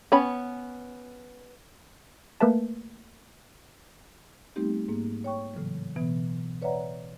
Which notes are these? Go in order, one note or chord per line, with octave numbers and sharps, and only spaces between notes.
B3 C#4 C#5 B5
A3 A#3 A#4 B4 E5 A5
G3 A3 B3 C4 D#4 G4
G#2 A#3
C#5 G5 C#6
A2 C#3 E3 F#3
B2 E3 B3
B4 C#5 D5 E5 F#5 A#5